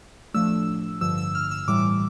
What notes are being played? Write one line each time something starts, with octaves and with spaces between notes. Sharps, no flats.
A2 F3 A3 D4 E6
G2 D3 F3 E6
E6
F6
E6
A2 E3 G3 D6